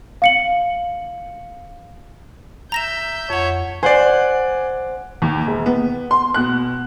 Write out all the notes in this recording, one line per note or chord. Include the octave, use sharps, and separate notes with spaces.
F5 C#7 F#7
E5 A#5 G6 A#6 E7
F2 C#5 F#5
C5 D5 F#5 G#5
D#2
E1
B3
C6
B2 F#6